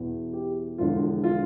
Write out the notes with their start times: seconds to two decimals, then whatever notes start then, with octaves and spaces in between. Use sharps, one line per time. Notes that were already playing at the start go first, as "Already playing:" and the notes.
Already playing: E2 B2
0.33 G4
0.78 E1 E2 D3 F3 F4
1.24 F4